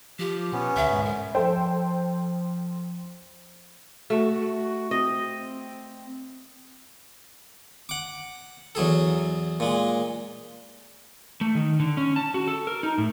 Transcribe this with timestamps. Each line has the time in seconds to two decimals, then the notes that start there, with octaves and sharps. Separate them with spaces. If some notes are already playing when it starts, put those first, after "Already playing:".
0.19 F3 G4
0.53 B2 B3 C#4
0.76 D2 E5
0.91 G#2
1.04 A#4
1.35 F3 A4 C5 G5
4.10 A3 F#4
4.91 C4 D#5
7.89 F#5 D6
8.75 E2 F#3 G#4 A4
9.60 A#2 G#3
11.41 A3
11.55 D#3
11.80 D3
11.97 C#4
12.16 A5
12.34 F#4
12.47 A4
12.67 A#4
12.83 D#4
12.98 A2